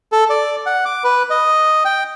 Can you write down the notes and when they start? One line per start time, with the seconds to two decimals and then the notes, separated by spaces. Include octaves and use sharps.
0.12 A4
0.30 D5
0.66 F#5
0.85 D6
1.04 B4
1.30 D#5
1.85 G5